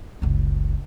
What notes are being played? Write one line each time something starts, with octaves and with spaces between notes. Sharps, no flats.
F#1 C#2